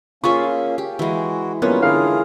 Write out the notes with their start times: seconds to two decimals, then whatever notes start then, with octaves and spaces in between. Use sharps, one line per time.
0.24 A#3 C#4 F4 G#4 E5 C#6
0.78 G4
0.99 E3 G#3 E4 F#4
1.62 F#3 G3 A#3 B3 C#4 F4
1.82 D3 E4 F4 G#4 A#4 F5